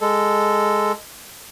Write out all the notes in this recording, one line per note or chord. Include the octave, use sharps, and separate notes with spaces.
G#3 A4